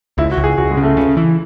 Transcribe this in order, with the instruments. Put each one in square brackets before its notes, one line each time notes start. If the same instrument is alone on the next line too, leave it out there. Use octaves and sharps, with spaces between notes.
[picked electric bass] C#2 [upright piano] E4
[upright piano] F#4
[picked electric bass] C#2
[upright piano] G#4
[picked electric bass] C#2 [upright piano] F#4
[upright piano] G#3
[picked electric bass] C#3
[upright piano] A3
[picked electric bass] C#3
E3